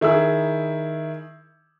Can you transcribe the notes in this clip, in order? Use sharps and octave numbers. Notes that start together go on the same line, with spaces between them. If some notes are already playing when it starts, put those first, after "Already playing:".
D#3 E4 G#4 E6